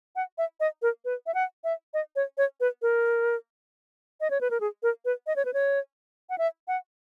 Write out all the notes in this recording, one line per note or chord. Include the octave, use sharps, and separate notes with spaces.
F#5
E5
D#5
A#4
B4
E5
F#5
E5
D#5
C#5
C#5
B4
A#4
D#5
C#5
B4
A#4
G#4
A#4
B4
D#5
C#5
B4
C#5
F#5
E5
F#5